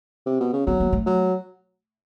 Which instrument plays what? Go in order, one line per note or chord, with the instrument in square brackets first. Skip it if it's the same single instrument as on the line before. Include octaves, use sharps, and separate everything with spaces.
[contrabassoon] C3
B2
C#3
[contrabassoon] F#3 [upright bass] B3
[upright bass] A#3
A3
[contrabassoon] F#3